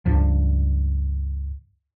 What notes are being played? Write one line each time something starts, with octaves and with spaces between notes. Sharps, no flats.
C#2 G2 F3